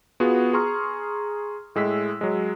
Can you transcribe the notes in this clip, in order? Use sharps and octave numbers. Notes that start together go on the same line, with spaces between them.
B3 F4 F#4 G#4
G#4 A#5 C6 C#6 F6
A2 G#3 E6 B6
F#3 G#3